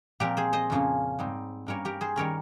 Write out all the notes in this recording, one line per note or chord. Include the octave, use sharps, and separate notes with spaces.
A#2 F3 C4 G4 A#4
G#4 C5
C5 D#5
F2 C#3 F3 A#3 C#4
G#2 G3 C4 D#4
G2 G3 A#3 C#4 A#4 C#5
G4 A#4
G#4 C5
D#3 G3 C#4 A#4 C#5